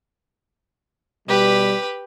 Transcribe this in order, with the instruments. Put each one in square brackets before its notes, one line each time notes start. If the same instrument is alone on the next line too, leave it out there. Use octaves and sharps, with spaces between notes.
[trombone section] B2 G3 [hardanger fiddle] G4 B4